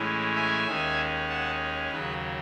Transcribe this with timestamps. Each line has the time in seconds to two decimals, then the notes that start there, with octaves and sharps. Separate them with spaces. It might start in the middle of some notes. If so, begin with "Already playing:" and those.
Already playing: A2 E3 G#3 C#4
0.35 E5 G#5
0.67 D#2 D#3 G#3 C#4
1.29 F#5 A5
1.92 D#2 C#3 F#3 G#4 B4